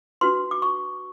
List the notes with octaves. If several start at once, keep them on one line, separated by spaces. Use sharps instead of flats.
D4 F#4 B4 C6
D6
C#6